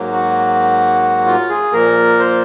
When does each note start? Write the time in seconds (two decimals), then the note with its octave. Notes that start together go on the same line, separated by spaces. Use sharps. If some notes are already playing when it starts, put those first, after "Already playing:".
Already playing: G#2 F#3 A#3
0.12 F#4
1.26 F4
1.50 G#4
1.72 A#2 F3 A#3 A#4
2.19 C5